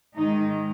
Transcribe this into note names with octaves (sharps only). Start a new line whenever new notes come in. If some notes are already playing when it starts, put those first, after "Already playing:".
G#2 D#3 G#3 D#4